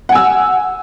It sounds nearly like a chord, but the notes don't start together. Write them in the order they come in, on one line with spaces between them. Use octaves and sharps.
F#5 G#5 E6